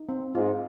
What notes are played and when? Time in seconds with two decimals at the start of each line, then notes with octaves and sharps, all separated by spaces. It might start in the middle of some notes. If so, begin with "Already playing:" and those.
Already playing: D#4
0.09 C4
0.35 G#2 F4